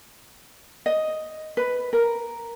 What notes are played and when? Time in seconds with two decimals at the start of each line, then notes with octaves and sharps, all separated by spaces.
0.86 D#5
1.57 B4
1.93 A#4